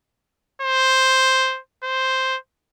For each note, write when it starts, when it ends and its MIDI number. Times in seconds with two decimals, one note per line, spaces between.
0.62 1.60 72
1.84 2.37 72